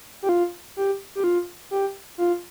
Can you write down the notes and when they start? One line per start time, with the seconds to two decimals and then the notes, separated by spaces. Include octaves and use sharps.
0.23 G4
0.29 F4
0.77 G4
1.15 G4
1.24 F4
1.71 G4
2.18 F4